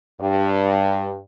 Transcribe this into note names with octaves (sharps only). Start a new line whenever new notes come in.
G2